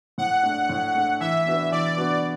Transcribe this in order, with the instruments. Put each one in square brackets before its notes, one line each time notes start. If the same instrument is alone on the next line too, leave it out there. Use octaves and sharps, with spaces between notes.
[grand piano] A2 [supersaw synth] F#5
[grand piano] A3 D4
A2
A3 D4
[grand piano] E3 [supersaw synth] E5
[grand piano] B3 D4 F#4 B4
[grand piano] E3 [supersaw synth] D5
[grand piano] B3 D4 F#4 B4